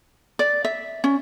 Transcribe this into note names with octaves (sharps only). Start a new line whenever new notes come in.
D5
E5
C#4